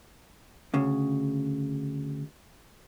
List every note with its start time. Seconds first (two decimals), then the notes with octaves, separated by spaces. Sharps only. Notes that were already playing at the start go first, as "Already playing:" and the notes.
0.74 D2 C#3